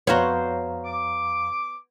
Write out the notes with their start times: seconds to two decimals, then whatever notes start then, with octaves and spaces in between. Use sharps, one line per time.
0.07 F2 B3 F#4 C5 C#5 F5 A#5
0.85 D6